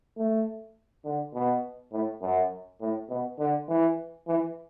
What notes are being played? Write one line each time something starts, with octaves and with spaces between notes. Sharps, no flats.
A3
D3
B2
A2
F#2
A2
B2
D3
E3
E3